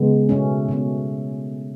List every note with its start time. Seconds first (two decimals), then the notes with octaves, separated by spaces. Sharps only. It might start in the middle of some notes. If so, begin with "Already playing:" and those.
Already playing: C#3 G#3 B3
0.29 B2 A3 C#4
0.69 B2 A3 C#4